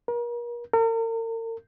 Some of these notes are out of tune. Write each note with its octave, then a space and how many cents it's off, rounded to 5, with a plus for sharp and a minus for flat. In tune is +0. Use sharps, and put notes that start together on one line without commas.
A#4 +40
A#4 -40